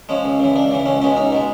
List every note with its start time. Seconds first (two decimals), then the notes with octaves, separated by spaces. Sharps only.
0.09 F3 G#3 C#4
0.25 C#2
0.40 C#3 E3
0.56 C#2 D4
0.71 C#3 E3
0.86 C#2 C#4
1.01 B2 G#3 C#4
1.16 C#2 D#4
1.32 B2 G#3